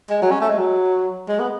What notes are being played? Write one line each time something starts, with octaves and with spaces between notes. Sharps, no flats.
G#3
F#3
C#4
A3
G#3
F#3
G#3
B3